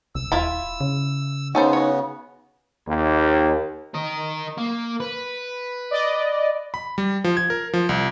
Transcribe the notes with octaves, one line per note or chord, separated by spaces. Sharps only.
C2 E6
D#1 E4 F4 B5
C#3
C#3 B3 C#4 D#4 A4 C5
F#4 C#5
D#2
A#4 D#5
A#3
B4
D5 D#5
B5
G3
F3
G#6
A#4
F3
C2